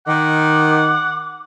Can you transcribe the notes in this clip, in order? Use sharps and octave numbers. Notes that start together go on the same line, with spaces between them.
D#3 F#5 D6